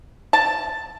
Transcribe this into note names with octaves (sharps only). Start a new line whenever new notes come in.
A5